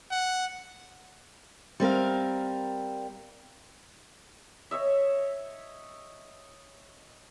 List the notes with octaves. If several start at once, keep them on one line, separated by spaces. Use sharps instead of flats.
F#5
G3 C4 A#4 F5
C#5 D#5 E5